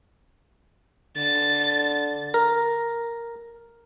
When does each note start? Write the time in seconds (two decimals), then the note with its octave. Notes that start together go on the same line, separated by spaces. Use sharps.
1.17 D3 A6
2.34 A#4